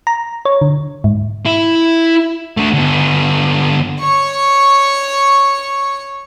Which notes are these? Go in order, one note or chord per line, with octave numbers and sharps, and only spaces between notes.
A#5
C#5
D3
G#2
E4
A3 D4
D3 B3
C#5 C#6